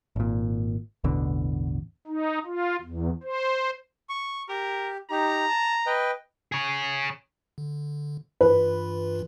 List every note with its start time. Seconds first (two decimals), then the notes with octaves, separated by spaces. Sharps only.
0.16 G#1 A#2
1.04 A1 E2 B2 D3
2.07 D#4
2.45 F4
2.82 E2
3.23 C5
4.09 C#6
4.49 G4 A#4
5.10 D#4 G4 A#5
5.49 A5
5.86 B4 D#5 G5
6.52 G#4 C#5
7.58 D3
8.41 G2 E3 F4 B4